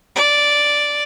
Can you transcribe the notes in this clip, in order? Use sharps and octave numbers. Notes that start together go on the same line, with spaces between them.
D5